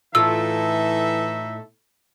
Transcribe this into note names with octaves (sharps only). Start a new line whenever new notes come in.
A2 E3 D#4 F4 A4 E5 E6